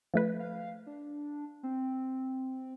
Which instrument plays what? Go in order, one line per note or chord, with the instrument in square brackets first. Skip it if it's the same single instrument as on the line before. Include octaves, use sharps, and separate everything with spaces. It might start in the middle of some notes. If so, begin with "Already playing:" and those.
[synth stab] F3 A3 B4
[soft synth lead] F5
D4
C4